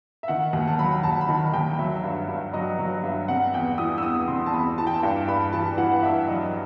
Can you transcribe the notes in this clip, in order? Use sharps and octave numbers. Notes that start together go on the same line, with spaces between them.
E5
D#3 F#5
D#2
A5
F#3 B5
D#2 A5
B5
D#3 A5
D#2 G5
F#3 E5
G2
G2
F#3 D#5
F#3
G2 E5
C3 F#5
E2 G5
E3 D#6
E6
E2 D#6
C3 C6
A5
E2 B5
E3 A5
G5
A5
G2 G5
G2 B5
E3 A5
E3 F#5
F#5
G2 E5
F#3 D#5